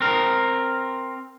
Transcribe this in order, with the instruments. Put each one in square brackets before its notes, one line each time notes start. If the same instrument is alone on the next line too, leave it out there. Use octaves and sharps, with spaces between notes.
[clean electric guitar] C4 A#4